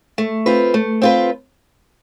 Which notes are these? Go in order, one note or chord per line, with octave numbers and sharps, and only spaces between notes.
A3
C4 F4 B4
A3
C4 F4 B4